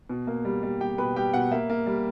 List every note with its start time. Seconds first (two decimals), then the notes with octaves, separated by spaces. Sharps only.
0.10 B2
0.27 A#3
0.45 G3
0.63 G3
0.81 G3 G4 G5
0.98 B2 B4 B5
1.16 G3 G4 G5
1.34 B2 F#5
1.51 A#3 E5
1.70 A#3
1.86 G3